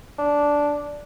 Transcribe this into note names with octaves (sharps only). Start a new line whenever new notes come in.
D4